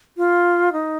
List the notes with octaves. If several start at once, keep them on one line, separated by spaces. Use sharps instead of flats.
F4
D#4